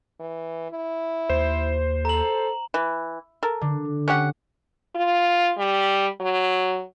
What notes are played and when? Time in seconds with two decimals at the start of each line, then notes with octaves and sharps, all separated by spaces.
0.20 E3
0.71 E4
1.30 D#2 C5 E7
2.05 A4 A#5 F#7
2.74 E3
3.43 A4 A#4
3.61 D3
4.08 C#4 G4 F#5
4.95 F4
5.57 G3
6.20 F#3